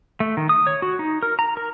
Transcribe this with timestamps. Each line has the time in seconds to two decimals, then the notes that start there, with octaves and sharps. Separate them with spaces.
0.20 A3
0.37 D#3
0.49 D#6
0.67 C#5
0.82 F#4
0.99 D#4
1.23 A#4
1.39 A#5
1.57 A#4